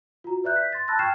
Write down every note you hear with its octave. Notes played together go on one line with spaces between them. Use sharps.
F4 F#4 A#5
B4 D5 E5 F#6 G6
B6
C6 A6
A5 B5 E6 F#6 A6 A#6
G5 C#6 F6 G#6 C7 E7